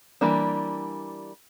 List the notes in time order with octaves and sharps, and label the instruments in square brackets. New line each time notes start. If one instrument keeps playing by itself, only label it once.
[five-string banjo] E3 G3 A#3 D4